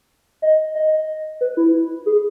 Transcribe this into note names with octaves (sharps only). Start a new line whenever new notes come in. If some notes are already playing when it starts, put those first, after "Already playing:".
D#5
D#5
B4
E4
G#4